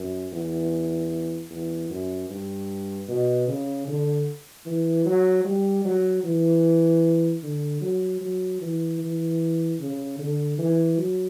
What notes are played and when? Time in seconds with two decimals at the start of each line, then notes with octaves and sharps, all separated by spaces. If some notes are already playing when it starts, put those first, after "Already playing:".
Already playing: F#2
0.32 E2
1.50 E2
1.90 F#2
2.30 G2
3.08 B2
3.48 C#3
3.88 D3
4.66 E3
5.06 F#3
5.45 G3
5.85 F#3
6.24 E3
7.43 D3
7.81 F#3
8.21 F#3
8.61 E3
9.00 E3
9.80 C#3
10.18 D3
10.58 E3
10.98 F#3